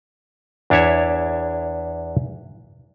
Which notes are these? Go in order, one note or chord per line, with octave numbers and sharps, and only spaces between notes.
E2 D4 E4 C#5 E5